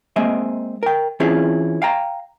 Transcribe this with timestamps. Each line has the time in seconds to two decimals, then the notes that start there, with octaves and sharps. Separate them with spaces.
0.16 G#3 A#3 C4 D#5 E5
0.83 A#4 G5
1.20 E3 C4 C#4 E4 F4 G#4
1.82 F5 G5 A#5